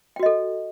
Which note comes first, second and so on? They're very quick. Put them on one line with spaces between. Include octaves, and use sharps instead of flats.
G5 F#4 D#5 A4